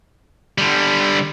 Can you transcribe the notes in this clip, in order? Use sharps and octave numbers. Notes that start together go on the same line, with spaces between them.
D3 G3